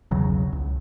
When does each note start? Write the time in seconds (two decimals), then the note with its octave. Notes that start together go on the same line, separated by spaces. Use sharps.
0.11 B1 E2 C#3 F#3
0.52 C#2